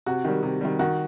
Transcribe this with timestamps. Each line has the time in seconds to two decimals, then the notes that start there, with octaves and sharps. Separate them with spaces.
0.06 C3 F#4
0.25 D#3 G3
0.43 C3
0.61 D#3 G3
0.79 D#3 F#4